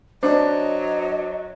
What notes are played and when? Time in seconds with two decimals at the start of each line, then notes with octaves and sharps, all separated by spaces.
0.23 F#3 D4 C5 D#5